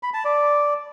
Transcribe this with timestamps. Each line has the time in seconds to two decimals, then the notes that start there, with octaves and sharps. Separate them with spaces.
0.03 B5
0.14 A5
0.25 D5